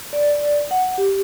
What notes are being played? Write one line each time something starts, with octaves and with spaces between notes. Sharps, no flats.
D5
F#5
G4